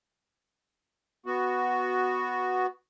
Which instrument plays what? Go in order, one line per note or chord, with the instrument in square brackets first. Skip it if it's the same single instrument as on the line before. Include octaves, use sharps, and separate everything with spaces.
[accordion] B3 F#4